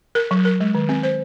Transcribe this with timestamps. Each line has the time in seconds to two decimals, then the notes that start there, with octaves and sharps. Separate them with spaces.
0.15 A#4
0.31 F#3
0.45 A#4
0.60 G#3
0.75 D#3
0.89 C4
1.03 C5